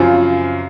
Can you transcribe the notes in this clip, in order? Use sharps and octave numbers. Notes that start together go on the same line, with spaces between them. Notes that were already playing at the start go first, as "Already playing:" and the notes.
Already playing: F#2 C#3 F3 C4 F4